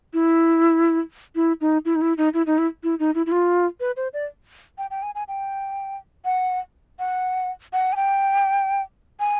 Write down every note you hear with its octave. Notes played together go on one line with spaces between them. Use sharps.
E4
E4
D#4
E4
D#4
E4
D#4
E4
D#4
E4
E4
D#4
E4
E4
F4
B4
C5
D5
G5
G5
G#5
G#5
G5
F#5
F#5
F#5
G#5
G5
G#5